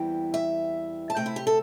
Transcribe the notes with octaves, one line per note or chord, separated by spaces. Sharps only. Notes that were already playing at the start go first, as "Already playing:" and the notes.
Already playing: E2 E3 G3 C4 G5
E5
A5
C3 A3 C4 G5
E4
G4
A4